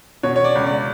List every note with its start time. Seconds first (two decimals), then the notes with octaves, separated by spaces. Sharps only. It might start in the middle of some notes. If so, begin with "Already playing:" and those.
0.23 B2 C#5
0.36 C#5
0.44 D5
0.55 C#2
0.66 D5